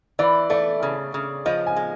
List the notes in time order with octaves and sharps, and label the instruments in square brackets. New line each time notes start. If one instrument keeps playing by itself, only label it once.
[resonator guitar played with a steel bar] E3 [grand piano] D5
[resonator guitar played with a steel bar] A3 [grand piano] D5
[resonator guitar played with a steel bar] C#3
C#3
[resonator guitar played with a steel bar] F3 [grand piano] D#5
[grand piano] G#5
[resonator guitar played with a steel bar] G#3